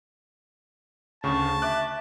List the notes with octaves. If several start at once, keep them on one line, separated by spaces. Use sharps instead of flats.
D2 C#3 A5 C#6
E5 D6 F#6